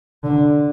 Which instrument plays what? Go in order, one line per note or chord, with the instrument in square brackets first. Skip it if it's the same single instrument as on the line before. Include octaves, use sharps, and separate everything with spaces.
[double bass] D3